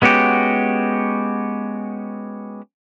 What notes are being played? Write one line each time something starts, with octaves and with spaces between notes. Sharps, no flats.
G#3 B3 C#4 F#4 G4